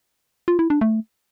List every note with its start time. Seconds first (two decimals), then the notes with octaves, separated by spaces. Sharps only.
0.48 F4
0.59 E4
0.70 D4
0.81 A3